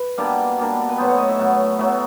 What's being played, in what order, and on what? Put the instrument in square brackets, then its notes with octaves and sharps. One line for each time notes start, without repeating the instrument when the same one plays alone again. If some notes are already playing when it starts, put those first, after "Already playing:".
Already playing: [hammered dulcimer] B4
B2 G3 A#3 D4
B2 G3 A#3 D4
B4
A2 F#3 B3 C5
C#5
D#5
E5
A2 F#3 B3
A2 F#3 B3 E5